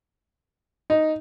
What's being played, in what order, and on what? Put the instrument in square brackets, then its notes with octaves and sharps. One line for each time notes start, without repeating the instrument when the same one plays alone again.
[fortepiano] D#4